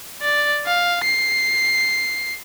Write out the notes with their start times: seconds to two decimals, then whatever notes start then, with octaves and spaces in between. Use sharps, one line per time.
0.21 D5
0.66 F5
1.04 C7